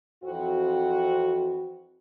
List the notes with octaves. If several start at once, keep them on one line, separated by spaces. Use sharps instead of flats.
F2 E3 C4 F#4